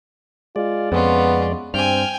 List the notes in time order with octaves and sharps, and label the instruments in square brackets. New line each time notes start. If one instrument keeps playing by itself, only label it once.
[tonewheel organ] G#3 D5 [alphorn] F4
[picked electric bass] F2 [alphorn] B3 [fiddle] C#4 F4
[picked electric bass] G2 [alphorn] C4 [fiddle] G5 G#5 [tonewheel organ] F6